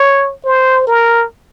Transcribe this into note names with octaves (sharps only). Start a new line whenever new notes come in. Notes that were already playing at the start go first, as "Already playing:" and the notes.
Already playing: C#5
C5
A#4